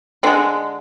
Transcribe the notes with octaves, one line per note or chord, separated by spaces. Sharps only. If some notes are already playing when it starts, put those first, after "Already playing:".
D3 G#3 C4